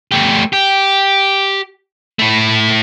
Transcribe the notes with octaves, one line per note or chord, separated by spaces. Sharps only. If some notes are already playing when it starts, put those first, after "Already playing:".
A3 G4
G4
A3 E4